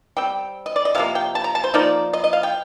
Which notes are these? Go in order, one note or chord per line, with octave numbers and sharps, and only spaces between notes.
G3 C4 G5
D#5
D5
D#5
C3 F3 A#3 F5
G5
A5
A#5
A5
C5
F3 A#3 D#4 D5
D#5
D#5
F5
G5